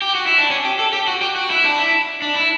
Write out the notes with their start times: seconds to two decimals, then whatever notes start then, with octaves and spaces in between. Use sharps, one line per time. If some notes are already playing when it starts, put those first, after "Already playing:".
0.02 G4
0.15 F#4
0.26 E4
0.38 D4
0.51 C#4
0.65 G4
0.79 A4
0.93 G4
1.08 F#4
1.22 G4
1.36 F#4
1.50 E4
1.65 D4
1.78 E4
2.22 D4
2.36 E4